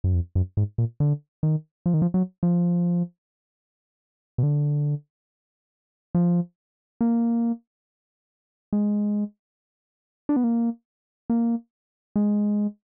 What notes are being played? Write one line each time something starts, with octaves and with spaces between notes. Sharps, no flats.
F#2
F2
F#2
G#2
A#2
D3
D#3
F3
D#3
F3
F#3
F3
B2
D3
F3
A#3
G#3
D4
B3
A#3
A#3
G#3